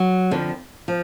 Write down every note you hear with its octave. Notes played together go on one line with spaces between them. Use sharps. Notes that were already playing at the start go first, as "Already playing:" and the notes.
Already playing: F#3
F2 D3 F3
F3